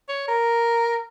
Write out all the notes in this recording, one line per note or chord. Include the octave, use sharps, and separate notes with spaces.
C#5
A#4